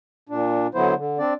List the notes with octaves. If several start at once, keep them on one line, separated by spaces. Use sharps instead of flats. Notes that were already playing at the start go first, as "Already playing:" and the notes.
A#2 D4
D3 F#3 B3 E4 C5
D3
C4 D4 D5